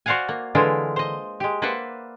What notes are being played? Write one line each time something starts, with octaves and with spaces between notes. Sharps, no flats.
F#4 C5 D5 F5 F#5 G#5
A#3
D3 E3 G#3 E4 F4 A#4
C5 D#5
G#3 G4
A#3 B4 C5 D5 E5 F#5